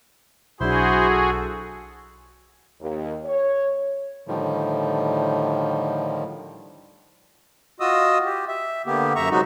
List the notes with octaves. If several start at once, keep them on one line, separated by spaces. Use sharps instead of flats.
B1 F#3 D4 E4 F#4 G#4 C5 C6
A4
D#2
C#5
A2 D3 D#3 F3 G3
F4 F#4 D#5 D#6 E6
G4
E5
D3 A#3 B3 G4
F#2 E5 A#5 C#6
C3 F#3 G#3 D#4 F#4